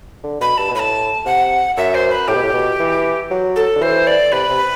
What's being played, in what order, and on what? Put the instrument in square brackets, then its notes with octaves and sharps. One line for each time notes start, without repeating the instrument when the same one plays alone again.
[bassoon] D3
[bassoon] B2 [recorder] B5
[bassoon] G2 [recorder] A5
[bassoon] B2
[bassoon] A2 [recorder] B5
[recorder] A5
[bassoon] C3 [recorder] F#5
[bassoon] F#2 [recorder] E5
[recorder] C5
B4
[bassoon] A2 [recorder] G4
[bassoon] B2
A2
B2
E3
F#3
[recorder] A4
[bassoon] D3
[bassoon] E3 [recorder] C5
[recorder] D5
[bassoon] C3 [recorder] B4
[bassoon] C3